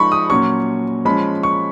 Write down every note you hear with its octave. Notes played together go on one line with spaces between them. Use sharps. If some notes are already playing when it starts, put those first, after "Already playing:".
Already playing: F3 G#3 D#4 B5 C#6
D#6
A#2 F#3 C#4 C#6
F3 G#3 C#4 B5
C#6